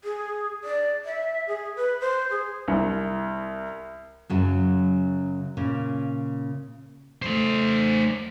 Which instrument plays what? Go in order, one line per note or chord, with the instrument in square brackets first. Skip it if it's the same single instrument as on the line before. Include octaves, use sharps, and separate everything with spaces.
[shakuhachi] G#4
D5
E5
G#4
B4
C5
G#4
[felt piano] C2
[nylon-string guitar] F#2 C#3 F#3
A#2 C#3
[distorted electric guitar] A3 C5